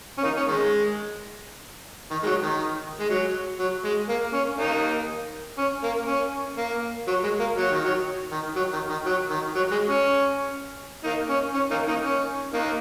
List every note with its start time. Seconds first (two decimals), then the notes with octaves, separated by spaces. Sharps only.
0.18 C#4
0.23 A#3 D#4
0.37 C#4
0.48 D#3 G#3
2.11 D#3
2.23 G#3
2.26 F#3
2.43 D#3
3.00 G#3
3.10 F#3
3.59 F#3
3.85 G#3
4.09 A#3
4.33 C#4
4.58 A#3 D#4
5.58 C#4
5.84 A#3
6.07 C#4
6.58 A#3
7.08 F#3
7.24 G#3
7.40 A#3
7.57 F#3
7.71 D#3
7.85 F#3
8.32 D#3
8.56 F#3
8.73 D#3
8.90 D#3
9.06 F#3
9.30 D#3
9.56 F#3
9.72 G#3
9.90 C#4
11.04 A#3 D#4
11.30 C#4
11.55 C#4
11.71 A#3 D#4
11.88 A#3 D#4
12.04 C#4
12.54 A#3 D#4